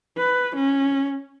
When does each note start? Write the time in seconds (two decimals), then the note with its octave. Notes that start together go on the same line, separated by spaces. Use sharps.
0.18 B4
0.55 C#4